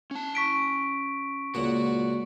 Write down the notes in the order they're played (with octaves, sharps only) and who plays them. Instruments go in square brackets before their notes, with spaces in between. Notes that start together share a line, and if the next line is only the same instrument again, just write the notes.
[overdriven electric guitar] C#4 A5
[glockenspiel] C#6 B6 D7
[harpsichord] C#2 A#2 [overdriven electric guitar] F#4